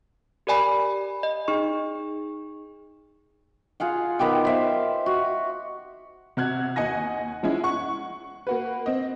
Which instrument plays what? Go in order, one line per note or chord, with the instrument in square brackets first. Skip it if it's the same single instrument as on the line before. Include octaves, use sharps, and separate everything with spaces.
[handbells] G4 A#4 D5 G#5 B5
D#5
D#4 G#4 C#6
[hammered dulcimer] F4 G#4 F5 F#5
D#3 B3 G4 G5
C5 E5 F5
F#4
[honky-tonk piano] C3 F#4 F#6 G#6
D#2 F#4 D#5 F#5 G#5 A#6
F3 G#3 C#4 E4
F#5 C#6
A#3 F#4 B4
C4 D#5